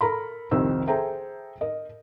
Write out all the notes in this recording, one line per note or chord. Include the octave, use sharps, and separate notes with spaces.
A4 A#4 A#5 B5
C2 F2 D#3 C5 E6
G#4 A4 C5 E5 G5 A#5
A#4 D#5